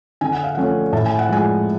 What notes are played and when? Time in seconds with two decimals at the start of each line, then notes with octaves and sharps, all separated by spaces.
0.21 D3 G#5
0.32 F#5
0.44 F5
0.55 F3 A3 C#4 F#5
0.92 A2 A5
1.06 G#5
1.19 F#5
1.29 F3 G#3 G#5